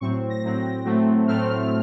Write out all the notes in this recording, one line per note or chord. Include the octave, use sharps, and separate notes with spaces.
A2 F#3 C4 C#6
A#6
A2 F#3 C4
A2 F#3 A3 C4
A2 F#3 A3 C4 F6